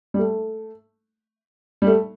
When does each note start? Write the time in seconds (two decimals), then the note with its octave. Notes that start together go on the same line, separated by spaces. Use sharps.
0.14 G3
0.19 A3
1.82 G3
1.87 A3